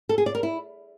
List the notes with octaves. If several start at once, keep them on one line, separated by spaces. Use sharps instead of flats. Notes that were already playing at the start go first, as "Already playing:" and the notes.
A4
G#4
D5
A#4
E4